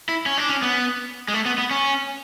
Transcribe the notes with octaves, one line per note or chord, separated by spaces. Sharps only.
E4
C#4
D4
C#4
B3
G#3
A3
B3
B3
C#4